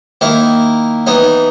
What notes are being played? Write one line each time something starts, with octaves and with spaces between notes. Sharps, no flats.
D#3 A#3 E4
E3 B3 D#4